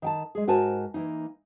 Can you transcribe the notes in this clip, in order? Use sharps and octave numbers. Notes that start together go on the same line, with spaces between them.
D#3 G5 A5
G#3 G#4
G#2 F#4 A#4 C5 G#5 A5
E3 A#3 D#4